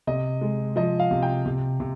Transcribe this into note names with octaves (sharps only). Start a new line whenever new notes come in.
C3 D#5
G#3
F3 D#5
F5
C3
G5
C3
C3